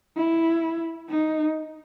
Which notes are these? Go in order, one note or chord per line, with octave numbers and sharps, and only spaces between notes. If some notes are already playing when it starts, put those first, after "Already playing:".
E4
D#4